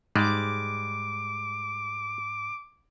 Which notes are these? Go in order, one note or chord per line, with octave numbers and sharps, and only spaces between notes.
G#2 G3 G#3 D6